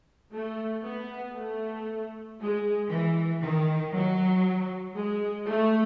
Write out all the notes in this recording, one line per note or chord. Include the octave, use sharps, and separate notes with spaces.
A3
B3
A3
G#3
E3
D#3
F#3
G#3
A3